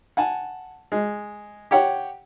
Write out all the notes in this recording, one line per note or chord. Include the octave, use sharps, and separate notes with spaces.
F#5 G#5 A5
G#3
G4 C#5 F#5 G5